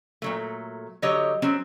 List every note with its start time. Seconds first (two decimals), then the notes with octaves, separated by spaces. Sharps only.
0.22 A#2 F#3 A3
1.02 D3 F#3 F#4 G4 C#5 D#5
1.42 F#3 C4 C#4 G#4